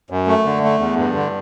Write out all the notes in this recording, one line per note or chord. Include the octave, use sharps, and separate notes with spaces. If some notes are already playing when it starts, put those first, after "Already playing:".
F#2
A3
D3
A3
E2
G2
D3